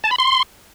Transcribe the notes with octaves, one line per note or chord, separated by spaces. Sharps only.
A5
B5
C6